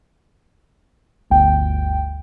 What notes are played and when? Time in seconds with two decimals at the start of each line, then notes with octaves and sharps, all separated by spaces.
1.30 G1 D2 G5